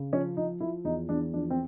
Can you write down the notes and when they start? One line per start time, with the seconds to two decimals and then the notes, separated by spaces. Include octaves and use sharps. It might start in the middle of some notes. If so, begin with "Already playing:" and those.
Already playing: C#3
0.13 F3 C#4
0.37 F3 D#4
0.60 F3 E4
0.85 E2 D#4
1.09 E2 D4
1.33 F3 D4
1.50 C4